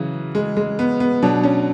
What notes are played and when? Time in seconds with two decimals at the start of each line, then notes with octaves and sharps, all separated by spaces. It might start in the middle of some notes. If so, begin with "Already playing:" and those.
Already playing: C#3 E3 F#3
0.35 G#3
0.57 G#3
0.79 B3
1.00 B3
1.22 B2 F#3 D4
1.44 C#4